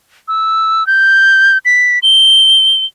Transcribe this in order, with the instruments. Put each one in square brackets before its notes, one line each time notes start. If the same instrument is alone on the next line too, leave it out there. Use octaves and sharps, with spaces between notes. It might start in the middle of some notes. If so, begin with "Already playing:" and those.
[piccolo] E6
G6
B6
G7